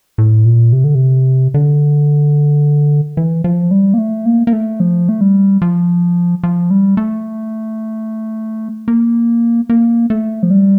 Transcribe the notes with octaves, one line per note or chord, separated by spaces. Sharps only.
A2
A#2
C3
D3
C3
D3
E3
F3
G3
A#3
A3
A#3
A#3
A3
F3
A3
G3
F3
F3
G3
A3
A#3
A#3
A3
F3
G3